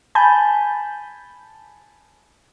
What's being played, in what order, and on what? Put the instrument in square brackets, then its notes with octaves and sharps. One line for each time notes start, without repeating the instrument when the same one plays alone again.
[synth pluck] G#5 A5 B5 G6